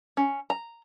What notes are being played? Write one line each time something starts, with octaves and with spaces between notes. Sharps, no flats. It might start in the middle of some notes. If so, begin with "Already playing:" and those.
C#4
A#5